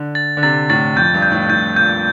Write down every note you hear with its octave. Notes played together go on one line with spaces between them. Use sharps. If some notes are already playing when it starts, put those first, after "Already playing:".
Already playing: D3
A6
D3
C3 A6
A2 A6
F2 G6
G2
G6
A2
A2 G6
A#2 G6